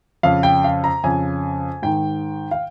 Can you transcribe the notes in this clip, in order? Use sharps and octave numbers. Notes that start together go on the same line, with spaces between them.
F2 C#3 F5
G5
F5
A#5
F2 C#3 G#5
G#2 D#3 G5
F5